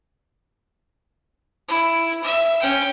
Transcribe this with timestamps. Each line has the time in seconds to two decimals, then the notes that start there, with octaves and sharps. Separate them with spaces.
1.68 E4
2.23 E5
2.61 C#4 G5